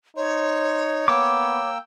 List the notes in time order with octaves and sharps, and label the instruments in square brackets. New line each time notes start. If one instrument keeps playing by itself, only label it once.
[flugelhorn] D#4 [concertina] C5 [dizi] C#5
[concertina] A#3 G5 E6 [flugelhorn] B3 [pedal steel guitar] D6